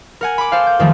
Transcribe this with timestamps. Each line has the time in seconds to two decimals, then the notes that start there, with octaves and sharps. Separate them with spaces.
0.21 A#4 F#5 G#5
0.38 B5 D6
0.52 A4 C5 F5
0.67 G6
0.79 F2 D#3 F3 G#3 A3